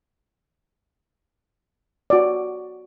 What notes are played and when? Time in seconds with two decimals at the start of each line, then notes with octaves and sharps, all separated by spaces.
2.10 F#4 D5